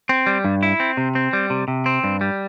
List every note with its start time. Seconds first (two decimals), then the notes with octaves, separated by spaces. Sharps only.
0.09 C4
0.27 G3
0.45 G2
0.63 E4
0.80 C4
0.97 C3
1.15 C4
1.33 G3
1.50 C3
1.68 C3
1.86 C4
2.04 G2
2.21 G3